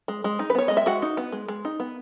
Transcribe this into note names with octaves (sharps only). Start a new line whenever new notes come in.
G#3
G#3
D#4
B4
B3 C#5
G#3 D#5
E5
G#3 F#4 F#5
D#4
B3
G#3
G#3
D#4
B3